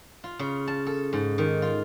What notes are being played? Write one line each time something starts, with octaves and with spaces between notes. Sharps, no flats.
F4
C#3
A5
A4
G#2
D#3
F4